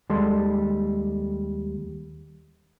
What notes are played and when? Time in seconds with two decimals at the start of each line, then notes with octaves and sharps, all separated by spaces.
0.09 D#2 G3 G#3 A4 C6